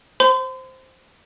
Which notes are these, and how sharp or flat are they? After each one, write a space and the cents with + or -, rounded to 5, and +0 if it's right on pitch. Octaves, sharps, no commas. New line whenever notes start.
C5 +0 C6 -40